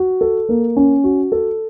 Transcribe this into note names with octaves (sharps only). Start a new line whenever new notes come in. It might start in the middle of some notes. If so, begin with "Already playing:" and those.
Already playing: F#4
A4
A#3
C#4
F#4
A4